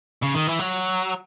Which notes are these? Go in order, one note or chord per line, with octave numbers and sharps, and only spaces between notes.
C#3
D#3
E3
F#3